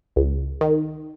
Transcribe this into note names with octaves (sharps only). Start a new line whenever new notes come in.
C#2
D#3